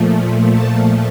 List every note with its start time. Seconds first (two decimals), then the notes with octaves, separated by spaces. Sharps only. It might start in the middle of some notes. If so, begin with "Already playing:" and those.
Already playing: A#2 F3 A3
0.54 A5